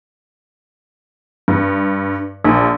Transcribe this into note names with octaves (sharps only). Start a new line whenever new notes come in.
G2
A#1